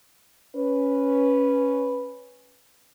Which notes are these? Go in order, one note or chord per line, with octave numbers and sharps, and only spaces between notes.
C#4 B4